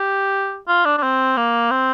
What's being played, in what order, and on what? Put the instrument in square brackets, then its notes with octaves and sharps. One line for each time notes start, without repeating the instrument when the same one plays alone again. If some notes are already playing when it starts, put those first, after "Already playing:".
Already playing: [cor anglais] G4
F4
D4
D4
C4
A#3
C4